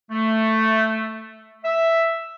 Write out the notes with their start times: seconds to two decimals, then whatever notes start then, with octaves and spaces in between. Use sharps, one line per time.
0.11 A3
1.64 E5